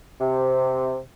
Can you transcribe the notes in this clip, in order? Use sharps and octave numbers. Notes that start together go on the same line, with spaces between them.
C3